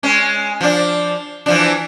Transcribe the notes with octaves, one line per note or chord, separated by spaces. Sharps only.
G#3 C#4
F3 D4
E3 F3 D4